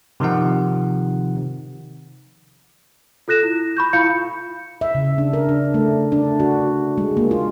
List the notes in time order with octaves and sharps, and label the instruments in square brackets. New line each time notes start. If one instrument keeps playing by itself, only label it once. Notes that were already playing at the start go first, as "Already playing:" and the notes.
[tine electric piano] C3 D#3 F3 D#4 F#5
[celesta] F4 A4 F#6 A#6 E7
E4
B5 C#6 G6
E4 F4 F5 B5 G6 C#7
[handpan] E5
C#3
D4
A#4
D4
A3
D4
F#4
G#3
A#3
F4